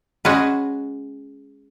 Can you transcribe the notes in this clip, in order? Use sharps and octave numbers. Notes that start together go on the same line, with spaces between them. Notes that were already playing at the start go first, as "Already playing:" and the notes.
G#3 C#4 F#4 B4